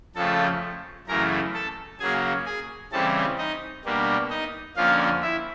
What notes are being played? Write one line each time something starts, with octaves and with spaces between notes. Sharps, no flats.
F2 C#3 F3 A3 A4 A5
F#2 C#3 E3 A3 A#4 A#5
A4 A5
C#3 F#3 A#3 G#4 G#5
G#4 G#5
C#3 E3 G3 C4 A4 A5
D#4 D#5
B2 G3 A#3 D4
D#4 D#5
F2 D3 F3 A#3 C#4 F4 F5
E4 E5